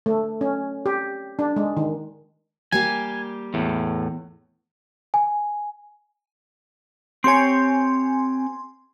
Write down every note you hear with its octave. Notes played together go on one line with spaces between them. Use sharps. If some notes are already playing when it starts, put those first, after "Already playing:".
A3
C#4
G4
D4
G#3
D#3
G3 A#3 G4 G#5
E2 A2
G#5
C4 G4 C#5 G#5 C6